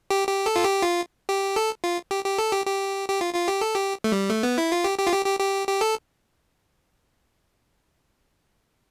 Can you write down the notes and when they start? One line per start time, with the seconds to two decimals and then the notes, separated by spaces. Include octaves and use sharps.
0.10 G4
0.28 G4
0.46 A4
0.56 F4
0.64 G4
0.82 F4
1.29 G4
1.56 A4
1.84 F4
2.11 G4
2.25 G4
2.38 A4
2.52 G4
2.66 G4
3.09 G4
3.21 F4
3.34 F4
3.48 G4
3.61 A4
3.75 G4
4.04 A3
4.12 G3
4.30 A3
4.43 B3
4.58 E4
4.72 F4
4.84 G4
4.99 G4
5.07 F4
5.12 G4
5.26 G4
5.39 G4
5.68 G4
5.81 A4